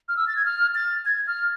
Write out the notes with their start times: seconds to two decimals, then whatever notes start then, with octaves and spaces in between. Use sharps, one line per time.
0.09 F6
0.17 E6
0.28 A6
0.36 G#6
0.46 F6
0.75 A6
1.06 G#6
1.27 F6